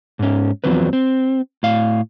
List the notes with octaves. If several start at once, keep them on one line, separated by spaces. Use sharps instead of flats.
G#2 C#4
E2 D#3 F3 F#3 C4 B4
C4
A2 F5